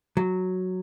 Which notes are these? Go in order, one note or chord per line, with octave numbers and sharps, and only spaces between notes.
F#3